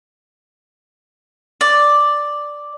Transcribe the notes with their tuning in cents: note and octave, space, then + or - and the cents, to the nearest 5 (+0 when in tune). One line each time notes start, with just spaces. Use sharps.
D5 +0